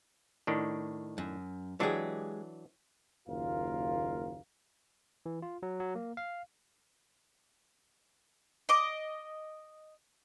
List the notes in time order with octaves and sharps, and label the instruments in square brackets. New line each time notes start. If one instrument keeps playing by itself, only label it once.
[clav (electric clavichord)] A2 D#3 D4
[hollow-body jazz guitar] F#2
[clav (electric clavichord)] E3 F#3 D4 [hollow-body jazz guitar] G#3 G4 G#4
[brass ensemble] F#1 D#2 F4 A#4 F5
[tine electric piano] E3
F4
F#3
F#3
A#3
F5
[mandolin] D#5 D6